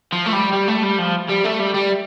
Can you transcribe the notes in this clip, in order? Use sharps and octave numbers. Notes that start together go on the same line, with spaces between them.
F3
A3
G3
G3
A3
G3
F3
G3
A3
G3
G3